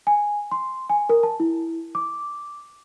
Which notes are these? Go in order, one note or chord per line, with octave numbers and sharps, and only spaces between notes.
G#5
C6
G#5
A#4
A5
E4
D6